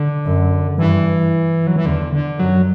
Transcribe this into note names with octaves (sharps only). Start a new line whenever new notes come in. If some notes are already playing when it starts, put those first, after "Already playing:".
Already playing: D3
F#2
G2 E3
F#3
E3
E2 D3
D3
F#2 F#3